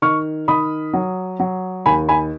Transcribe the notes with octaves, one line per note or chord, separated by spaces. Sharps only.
D#3 C#6 F6
D#3 B5 D#6
F#3
F#3
D#2 G#5 B5
G#5 B5